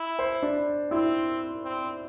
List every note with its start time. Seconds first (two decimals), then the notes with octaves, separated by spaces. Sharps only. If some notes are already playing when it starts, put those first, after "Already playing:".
Already playing: E4
0.19 C5
0.43 D4
0.91 C4 E4
1.64 C4